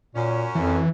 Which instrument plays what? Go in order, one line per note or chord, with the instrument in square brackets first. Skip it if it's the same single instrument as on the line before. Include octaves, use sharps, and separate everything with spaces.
[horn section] F#2 C#4 [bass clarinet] A#2
[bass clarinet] F2 [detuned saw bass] E3